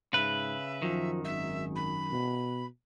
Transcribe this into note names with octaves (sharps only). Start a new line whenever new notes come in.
G#2 C#3 B4 E5
F#2 D#3 F3
G#1 E5
B5
B2